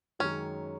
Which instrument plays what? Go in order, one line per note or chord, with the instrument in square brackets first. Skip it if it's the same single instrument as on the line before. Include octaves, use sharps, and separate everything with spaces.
[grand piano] F#2 D#3 G#3 [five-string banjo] C#4